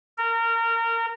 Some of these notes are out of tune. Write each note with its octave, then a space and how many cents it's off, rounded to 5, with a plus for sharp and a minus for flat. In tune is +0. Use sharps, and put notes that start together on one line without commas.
A#4 -25